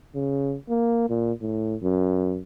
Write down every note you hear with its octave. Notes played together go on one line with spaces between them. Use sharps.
C#3
A#3
A#2
A2
F#2